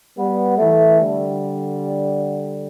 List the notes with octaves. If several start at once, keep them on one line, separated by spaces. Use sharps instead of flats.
G3 B3
E3 A3
D3 G3